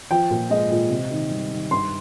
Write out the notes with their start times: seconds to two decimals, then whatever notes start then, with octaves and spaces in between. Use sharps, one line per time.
0.10 F3 G5
0.31 A#2
0.50 G#3 D#5
0.71 A#2
0.90 C3
1.10 D#3
1.31 G3
1.50 D#3
1.71 G2 C6